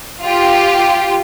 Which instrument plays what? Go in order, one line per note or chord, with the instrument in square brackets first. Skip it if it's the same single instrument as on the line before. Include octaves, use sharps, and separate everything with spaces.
[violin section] F4 G4